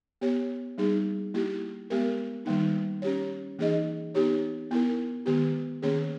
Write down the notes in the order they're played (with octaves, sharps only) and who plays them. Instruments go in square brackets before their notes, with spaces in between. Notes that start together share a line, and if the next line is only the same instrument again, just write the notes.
[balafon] B3 G4 C#5
G3 A#3 D#4 G#4
A#3 E4 G4
G#3 B3 G4 A#4
D#3 G3 A#3 D#4
C#4 G4 C#5
E3 A#3 D#4 G#4 D#5
B3 D#4 G4 C#5
B3 E4 A#4
D#3 G#3 B3 G4
D#3 A#3 C#4 G#4 C#5